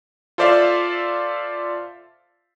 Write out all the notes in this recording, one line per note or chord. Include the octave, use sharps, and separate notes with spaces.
F4 A4 C5 D5 E5 F5